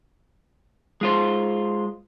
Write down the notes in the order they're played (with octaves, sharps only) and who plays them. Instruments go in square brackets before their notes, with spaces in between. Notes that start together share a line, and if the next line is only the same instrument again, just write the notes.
[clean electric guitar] G#3 F4 C5